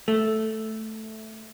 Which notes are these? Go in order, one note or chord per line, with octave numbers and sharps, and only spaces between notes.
A3